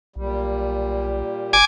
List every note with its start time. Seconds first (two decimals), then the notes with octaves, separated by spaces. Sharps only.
0.16 B1 A#2 G3
1.53 F1 G#5 D6